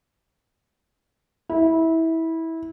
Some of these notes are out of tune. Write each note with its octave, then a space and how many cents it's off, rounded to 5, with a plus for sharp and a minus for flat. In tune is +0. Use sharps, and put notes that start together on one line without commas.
E4 -20